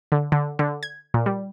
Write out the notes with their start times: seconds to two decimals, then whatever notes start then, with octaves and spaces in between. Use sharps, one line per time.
0.12 D3
0.32 D3
0.59 D3
0.83 G#6
1.14 A#2
1.26 G3